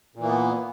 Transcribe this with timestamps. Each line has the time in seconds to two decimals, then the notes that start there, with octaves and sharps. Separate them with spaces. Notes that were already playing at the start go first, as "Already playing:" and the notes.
0.16 A#2
0.20 E3
0.24 A#3
0.28 B3